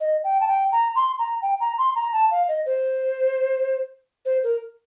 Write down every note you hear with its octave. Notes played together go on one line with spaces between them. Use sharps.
D#5
G5
A5
G5
A#5
C6
A#5
G5
A#5
C6
A#5
A5
F5
D#5
C5
C5
A#4